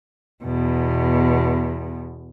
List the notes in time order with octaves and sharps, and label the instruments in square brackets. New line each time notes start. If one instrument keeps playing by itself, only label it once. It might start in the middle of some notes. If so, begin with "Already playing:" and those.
[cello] E2 B2